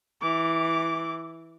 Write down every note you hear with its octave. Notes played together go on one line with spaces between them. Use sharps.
E3 D6